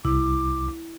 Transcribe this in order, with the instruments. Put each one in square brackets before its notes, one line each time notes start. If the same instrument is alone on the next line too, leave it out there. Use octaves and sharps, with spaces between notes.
[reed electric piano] C2 [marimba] E4 [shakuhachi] D6